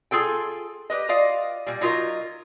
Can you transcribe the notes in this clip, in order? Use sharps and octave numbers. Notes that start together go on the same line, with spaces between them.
F4 G#4 A4 G5
G4 B4 D#5
F4 D5 D#5 F5
A#2 G3
F#3 D#4 F4 G4 A#4 D#5